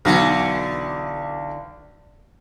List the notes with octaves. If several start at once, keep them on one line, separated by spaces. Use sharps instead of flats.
B1 D3 E3